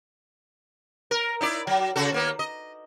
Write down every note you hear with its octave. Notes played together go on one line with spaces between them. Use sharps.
A#4
D#4 E4 D5
F#3
C#3 F#4 A4
D#2 A#3 B3
D#5